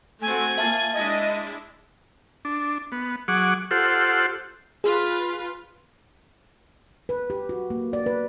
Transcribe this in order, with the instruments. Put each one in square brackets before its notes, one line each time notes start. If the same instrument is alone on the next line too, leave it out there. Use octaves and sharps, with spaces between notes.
[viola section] A3 C4 F#4 [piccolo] G#5
[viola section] A#3 F4 [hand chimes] E5 A5 A6
[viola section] G#3 D4 E4 [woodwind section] D#5
[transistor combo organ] D4
B3
F#3 G#4 F#5 C#6 D6
F4 G4 A4 C5 F#5
[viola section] F4 B4 [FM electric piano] G#4
[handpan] B4
G4
F#4
A#3
D5
B4